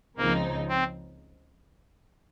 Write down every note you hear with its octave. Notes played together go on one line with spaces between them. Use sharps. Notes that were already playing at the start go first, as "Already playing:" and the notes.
C#2 C#3 F3 A#3 C4 D#4
C4